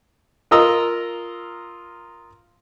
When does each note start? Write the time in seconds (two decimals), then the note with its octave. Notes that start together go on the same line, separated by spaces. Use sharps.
0.51 F4 A#4 D#5 A#5 E6